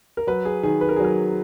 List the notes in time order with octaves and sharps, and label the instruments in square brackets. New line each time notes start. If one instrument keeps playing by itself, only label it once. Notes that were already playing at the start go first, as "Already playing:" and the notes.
[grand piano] A#4
F#3 B4
G#4
D#3 G#4
B4
A#4
G#4
F#3 A#4